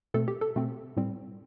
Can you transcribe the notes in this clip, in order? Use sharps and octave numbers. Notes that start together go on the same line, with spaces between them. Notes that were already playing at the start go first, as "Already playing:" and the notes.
B2 A3 C4 A4
G4
A4
B2 A3 C4
A2 G3 C4